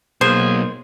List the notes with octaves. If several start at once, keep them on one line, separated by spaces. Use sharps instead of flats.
B1 A#3 G#4 C5